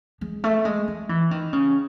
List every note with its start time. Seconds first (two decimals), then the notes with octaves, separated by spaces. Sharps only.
0.21 G#3
0.44 A3
0.65 G#3
0.88 G#3
1.09 E3
1.31 D#3
1.53 C#3